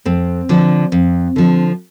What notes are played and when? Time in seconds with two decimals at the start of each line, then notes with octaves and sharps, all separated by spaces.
0.05 F2 C4
0.49 D3 F3
0.92 F2
1.36 D3 F3